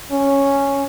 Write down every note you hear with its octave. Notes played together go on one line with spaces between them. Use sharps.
C#4